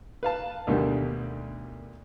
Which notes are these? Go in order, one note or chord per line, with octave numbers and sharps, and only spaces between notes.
B4 F5 A5
D2 B2 D3 D#3 G3